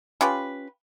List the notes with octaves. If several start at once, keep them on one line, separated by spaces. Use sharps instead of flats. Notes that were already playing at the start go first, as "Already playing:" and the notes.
C#4 F4 G4 B4